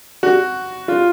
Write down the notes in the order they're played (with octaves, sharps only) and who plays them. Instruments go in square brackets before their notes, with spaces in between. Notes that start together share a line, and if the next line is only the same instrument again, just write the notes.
[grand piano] F#4
F4